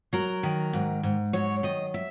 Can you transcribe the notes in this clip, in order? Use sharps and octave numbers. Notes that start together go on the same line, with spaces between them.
F#3 A#4
D#3
G#2
G#2
F#3 C#5
D#3 D#5
E5